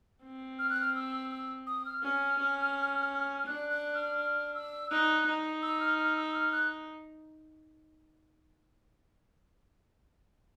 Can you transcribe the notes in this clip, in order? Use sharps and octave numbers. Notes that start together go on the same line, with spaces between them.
C4
F6
F#6
F6
E6
E6
D#6
F6
C#4 F6
C#4
D4 F#6
F#6
F6
F6
E6
D#4 F#6
D#4
E6
F6
F6
E6
F6
F#6